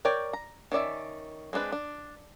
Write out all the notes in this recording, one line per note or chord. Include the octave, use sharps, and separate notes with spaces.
A#4 C#5 D5 G5
A#5
D#3 C#4 D5 E5
G#3 C4 D4 B4
D4